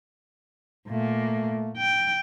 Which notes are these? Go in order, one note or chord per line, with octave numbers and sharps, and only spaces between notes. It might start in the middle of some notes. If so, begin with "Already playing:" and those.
A#2 A3 A#3
G5